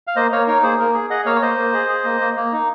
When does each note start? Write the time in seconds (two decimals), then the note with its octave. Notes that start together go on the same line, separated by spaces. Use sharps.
0.07 F5
0.16 A#3 C5 D#5
0.32 A#3 C#5 F5
0.47 D#4 A#4 C#5
0.63 A#3 G#4 C5
0.79 A#3 A#4
0.94 G#4
1.10 G#4 D#5 F#5
1.26 A#3 C#5 F5
1.36 C#5
1.42 A#3 C5 D#5
1.57 A#3
1.73 G#4
1.89 G#4
2.04 A#3
2.21 A#3
2.36 A#3
2.52 D#4